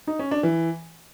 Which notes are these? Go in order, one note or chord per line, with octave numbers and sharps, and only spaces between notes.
D#4
C#4
D4
E3